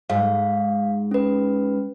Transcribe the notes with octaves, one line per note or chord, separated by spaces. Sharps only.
G#2 F5
C#4 B4